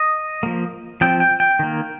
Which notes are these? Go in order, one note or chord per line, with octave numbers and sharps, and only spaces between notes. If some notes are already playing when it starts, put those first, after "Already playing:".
Already playing: D#5
F3 A#3
F3 C4 G5
G5
G5
D#3 A#3